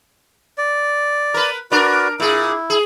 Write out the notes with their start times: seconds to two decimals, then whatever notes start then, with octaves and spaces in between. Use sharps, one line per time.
0.58 D5
1.34 A#4 B4
1.72 D4 F#4 A#4 B4 D5
2.20 A#2 E4 G#4
2.70 G#4